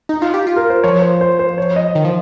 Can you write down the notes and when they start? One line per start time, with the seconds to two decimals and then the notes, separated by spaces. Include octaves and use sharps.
0.09 D#4
0.22 F4
0.34 G4
0.47 F4
0.56 A#4
0.70 C5
0.83 F3 C#5
1.02 C5
1.21 C5
1.39 C5
1.58 C#5
1.76 D#5
1.95 D#3
2.04 F3